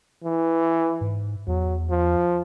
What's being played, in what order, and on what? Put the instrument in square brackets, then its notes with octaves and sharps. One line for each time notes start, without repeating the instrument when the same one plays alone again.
[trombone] E3
[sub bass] G#2
[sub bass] E2 [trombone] F#3
[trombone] F3